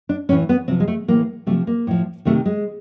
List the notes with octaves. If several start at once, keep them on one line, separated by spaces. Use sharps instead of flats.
D4
A2 E3 C#4
B3
C3 F3 C4
G#3
A3
A2 E3 A#3
C3 F3 A3
A#3
A2 F3
C3 D#3 A3
G#3